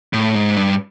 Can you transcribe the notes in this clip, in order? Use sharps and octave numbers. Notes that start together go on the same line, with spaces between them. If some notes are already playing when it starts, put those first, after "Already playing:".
A2
G#2
G2